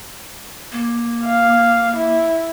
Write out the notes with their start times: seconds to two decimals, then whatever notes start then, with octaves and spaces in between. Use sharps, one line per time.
0.72 A#3
1.24 F5
1.96 E4